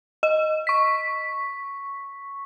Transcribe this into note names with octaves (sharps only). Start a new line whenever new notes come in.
D#5
C#6 B6